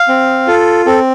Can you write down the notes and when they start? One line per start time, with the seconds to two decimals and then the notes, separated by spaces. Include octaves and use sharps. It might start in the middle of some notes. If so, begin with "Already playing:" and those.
Already playing: F5
0.08 C4
0.47 F4 A4
0.86 C4 A4